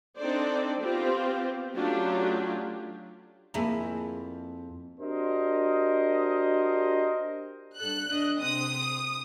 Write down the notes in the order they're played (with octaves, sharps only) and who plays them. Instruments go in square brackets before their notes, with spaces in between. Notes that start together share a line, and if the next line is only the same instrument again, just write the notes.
[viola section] C4 D4 D#4 A4 C5 D5
B3 C4 F4 G4 C5
F#3 A3 C#4 D4 F4 G4
[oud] F2 E4 G#4 [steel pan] A#3 E5 A#5
[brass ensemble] D4 F#4 G4 A#4 C5 D#5
[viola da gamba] G2 A4 [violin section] F#6
[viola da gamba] D4 D#5
[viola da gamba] C3 C4 [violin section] D#6